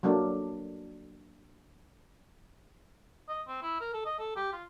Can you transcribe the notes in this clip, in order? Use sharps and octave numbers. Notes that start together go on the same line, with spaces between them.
F#3 A3 A#3 D4
D#5
C4
E4
A#4
A4
D#5
A4
G4
F4